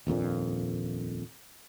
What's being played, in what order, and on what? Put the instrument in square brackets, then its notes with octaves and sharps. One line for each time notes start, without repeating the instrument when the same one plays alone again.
[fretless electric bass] D#1 A#1 F2 A#2